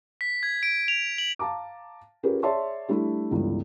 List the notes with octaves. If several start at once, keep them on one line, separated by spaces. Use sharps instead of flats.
B6
G#6
D7
F7
F#7
F5 A5 A#5 D6
C#4 F4 G4 G#4 A#4 B4
G#4 C#5 D5 E5 A5 C6
G3 A3 D4 E4
G1 C#2 G2 E3